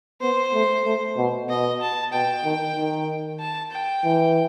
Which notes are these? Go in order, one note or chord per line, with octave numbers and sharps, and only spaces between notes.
B3 C5
A3
A3
B2
B2 D#5
A5
B2 G5
D#3
D#3
A5
G5
E3